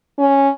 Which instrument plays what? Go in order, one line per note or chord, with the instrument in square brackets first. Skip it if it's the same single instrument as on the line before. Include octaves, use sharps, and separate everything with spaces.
[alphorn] C#4